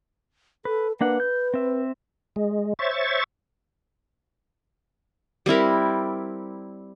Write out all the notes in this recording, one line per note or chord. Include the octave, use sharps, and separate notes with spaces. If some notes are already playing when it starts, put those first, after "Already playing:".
A4 B4
A#3 D4 B4 F#5
G6
C4 E5
G#3
C5 C#5 E5 C#6 A6
G3 C4 E4 A#4